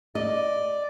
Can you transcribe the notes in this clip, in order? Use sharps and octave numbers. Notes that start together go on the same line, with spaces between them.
D5 D#5